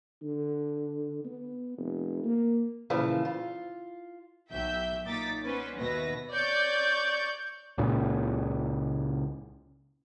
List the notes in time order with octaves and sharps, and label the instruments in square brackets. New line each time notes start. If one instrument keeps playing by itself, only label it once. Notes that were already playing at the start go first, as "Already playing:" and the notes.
[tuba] D3
B3
F1
A#3
[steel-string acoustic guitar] A#2 C#3 E3 F3
F4
[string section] B1 E5 G5 G6
A#2 D#4 D6 A6 B6
B3 C#4 B4 C5 D5
D#2 B2 B4 E5 A#6
[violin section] C#5 D5 G6
[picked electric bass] C#2 A#2 C#3